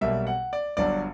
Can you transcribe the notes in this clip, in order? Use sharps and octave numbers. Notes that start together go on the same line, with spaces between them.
B1 B2 G3 A#3 E5
F#5
D5
G1 G2 F#3 D5